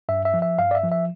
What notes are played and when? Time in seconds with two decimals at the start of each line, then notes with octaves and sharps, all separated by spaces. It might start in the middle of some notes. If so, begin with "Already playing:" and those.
0.09 G2 E5
0.25 E5
0.34 F3
0.42 E5
0.59 G2 F5
0.71 D5
0.75 E5
0.84 F3
0.92 E5